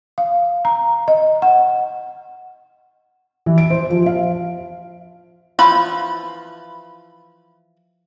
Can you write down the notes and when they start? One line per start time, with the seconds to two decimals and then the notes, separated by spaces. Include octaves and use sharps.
0.18 F5
0.65 A#5
1.08 D#5
1.42 F#5
3.46 E3
3.58 D7
3.70 C5
3.90 F3
4.06 F5
5.59 E3 F3 B5